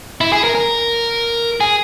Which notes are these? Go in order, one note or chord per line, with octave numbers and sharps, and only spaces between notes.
E4
G#4
A#4
A#4
G#4